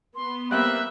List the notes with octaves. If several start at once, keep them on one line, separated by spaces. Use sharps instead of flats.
B3 C6
G3 A#3 C4 E5 F#6